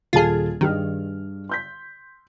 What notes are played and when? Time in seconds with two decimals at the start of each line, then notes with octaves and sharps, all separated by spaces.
0.13 D#1 F4 G#4 A4 A5
0.61 G2 D#3 G#4 F6
1.49 C6 G6 B6